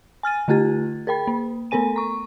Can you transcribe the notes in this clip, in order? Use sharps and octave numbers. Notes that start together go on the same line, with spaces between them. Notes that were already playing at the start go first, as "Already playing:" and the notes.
G#5 F6 A6 D#7
D3 A3 F4 G4 A6
G#4 A#4 G5 B5
A#3
A3 B3 A4 A#4 G#5 D#7
A#5 C#6